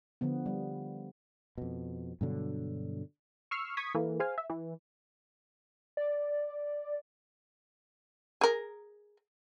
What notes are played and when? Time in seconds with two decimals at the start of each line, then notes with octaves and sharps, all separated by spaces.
0.21 D3 F3 B3
0.46 G3
1.58 F2 B2
2.21 G2 B2 D3 F#3
3.51 C#6 E6 F6 C7 C#7
3.77 C#6 D#6 G#6 B6
3.95 E3 A#3 A4
4.20 G#4 C5 F5 G#5
4.38 E5
4.50 E3
5.97 D5
8.41 G#4 A#4